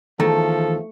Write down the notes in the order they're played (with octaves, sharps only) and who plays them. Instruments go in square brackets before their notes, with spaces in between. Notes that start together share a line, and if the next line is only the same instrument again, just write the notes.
[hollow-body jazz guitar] E2 D#3 A#5 [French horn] F3 [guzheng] A3 [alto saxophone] A4